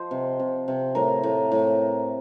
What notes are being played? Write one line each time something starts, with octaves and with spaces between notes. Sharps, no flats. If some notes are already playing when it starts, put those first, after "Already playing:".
Already playing: F3 C5 D#5
C3
C3
C3
A2 A#4
A2
A2